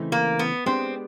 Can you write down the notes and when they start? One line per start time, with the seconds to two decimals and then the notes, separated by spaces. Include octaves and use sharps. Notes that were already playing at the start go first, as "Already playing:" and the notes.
Already playing: C#3 E3 A3 C4 D#4
0.12 A#3
0.39 B3
0.66 G#3 B3 C4 D4 G4